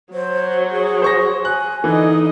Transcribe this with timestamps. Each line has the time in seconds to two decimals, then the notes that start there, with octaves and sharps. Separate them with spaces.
0.13 F#3 C5
0.71 G#4
1.02 C5 C#6 A#6
1.45 G#5 F#6
1.84 D3 E3 D#4 D#5